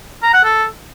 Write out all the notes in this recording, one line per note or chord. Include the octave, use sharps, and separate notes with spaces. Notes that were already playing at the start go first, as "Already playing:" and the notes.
A#5
F#5
A4